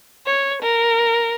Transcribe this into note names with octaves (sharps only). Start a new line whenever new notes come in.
C#5
A#4